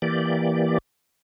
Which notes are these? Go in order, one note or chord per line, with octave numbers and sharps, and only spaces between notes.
E3 A#3 G4 D5